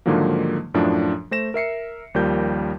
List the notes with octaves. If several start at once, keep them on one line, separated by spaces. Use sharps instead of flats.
G#2 D3 D#3 F3 F#3 A#3
F#2 A2 F3 D4
A3 C5 A#6 E7
A#4 E5 C7 C#7
D#2 F3 G3 A#4 G6